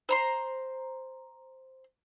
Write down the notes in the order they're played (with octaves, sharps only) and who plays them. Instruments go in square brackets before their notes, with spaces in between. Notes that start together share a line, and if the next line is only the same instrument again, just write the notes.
[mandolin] C5 A#5 C6